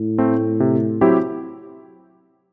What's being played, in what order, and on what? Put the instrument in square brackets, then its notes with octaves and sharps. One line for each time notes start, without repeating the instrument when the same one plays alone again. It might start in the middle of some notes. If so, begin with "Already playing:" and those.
Already playing: [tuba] A2
[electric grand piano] A3 C4
C3
F#3 C4 E4 G4